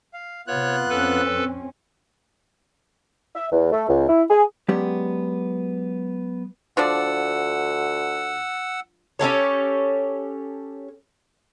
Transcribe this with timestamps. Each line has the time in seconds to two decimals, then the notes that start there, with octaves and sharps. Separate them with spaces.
0.13 F5
0.47 C3 B3 F4 C#5 F#6
0.89 F2 C4 C#4 A4 B4
3.35 E5
3.52 E2
3.72 A3
3.88 C#2
4.09 E4
4.30 G#4
4.69 F#3 G#3 B3 C#4 G4 D5
6.77 D2 F3 D4 D5 F#5 E6
9.19 C#4 G4 A4 C#5